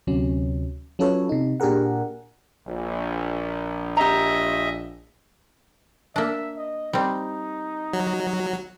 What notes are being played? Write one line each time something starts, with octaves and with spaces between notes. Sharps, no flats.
D2 C3 F#3 C#4
F#3 C#4 F4 A4 B4 C#5
C3 D#4
A#2 D4 G4 G#4 A#4 F#5
A#1
G4 D#5 E5 A#5
A#3 D4 E5
D#5
G3 C4 D#4
F#3